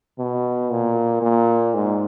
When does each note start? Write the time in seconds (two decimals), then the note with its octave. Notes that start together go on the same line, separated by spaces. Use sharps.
0.19 B2
0.71 A#2
1.22 A#2
1.75 G#2